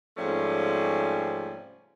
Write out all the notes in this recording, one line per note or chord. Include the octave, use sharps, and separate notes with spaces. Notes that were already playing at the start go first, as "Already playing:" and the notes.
G#2 C3 F3 G3 A3 C#4